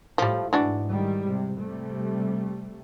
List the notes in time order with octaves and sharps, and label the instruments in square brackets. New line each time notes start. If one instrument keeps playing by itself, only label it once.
[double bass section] A2 A3 [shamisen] F3 G3
[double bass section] G#2 [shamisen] E3 D4 F#4
[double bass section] G#2 D#3 G3
C3
C3 G3 A3